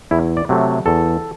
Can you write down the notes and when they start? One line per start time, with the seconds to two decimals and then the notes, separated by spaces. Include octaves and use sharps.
0.11 E2 E4
0.37 D5
0.49 C3 F#3 A3
0.86 E2 A4